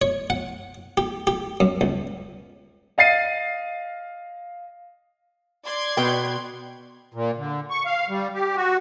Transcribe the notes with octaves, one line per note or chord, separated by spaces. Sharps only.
C#5
F#5
G4
G4
F#2
C#2
D#5 F5 A6 C7 D#7
D5 C6 G#6
B2 B4 G5
A#2
D3
C#6
F5
G3
G4
F#4